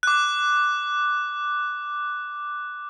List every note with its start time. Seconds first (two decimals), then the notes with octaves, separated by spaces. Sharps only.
0.03 D6 F#6